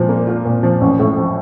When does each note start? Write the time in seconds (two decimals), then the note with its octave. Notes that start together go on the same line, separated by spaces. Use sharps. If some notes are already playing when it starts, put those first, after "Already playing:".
Already playing: A#2 F3
0.09 A#3
0.27 F4
0.45 A#2
0.63 F3
0.81 A1
0.99 A2
1.17 F3